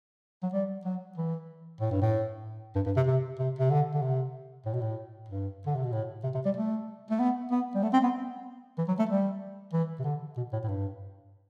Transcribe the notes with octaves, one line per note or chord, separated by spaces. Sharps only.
F#3
G3
F#3
E3
A2
G2
A2
G2
G2
C3
C3
C3
C3
D3
D3
C3
A2
B2
A2
G2
D3
C3
B2
A2
C3
C3
G3
A3
A3
B3
B3
G3
A3
C4
B3
E3
F#3
A3
G3
E3
C3
D3
B2
A2
A2
G2